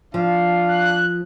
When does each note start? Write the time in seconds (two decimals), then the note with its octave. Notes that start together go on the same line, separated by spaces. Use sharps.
0.14 F3 D4 F5
0.68 F#6